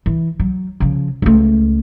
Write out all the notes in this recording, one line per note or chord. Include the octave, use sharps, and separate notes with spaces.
E3
F#3
C#3 F3
C#2 A3